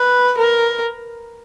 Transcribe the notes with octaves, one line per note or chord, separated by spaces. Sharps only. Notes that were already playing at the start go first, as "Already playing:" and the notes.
Already playing: B4
A#4